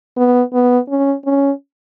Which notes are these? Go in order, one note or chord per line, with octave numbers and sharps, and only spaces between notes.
B3
B3
C#4
C#4